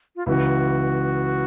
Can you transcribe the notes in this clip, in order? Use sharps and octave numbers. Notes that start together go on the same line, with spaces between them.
F4
C#2 C#3 E3 F#4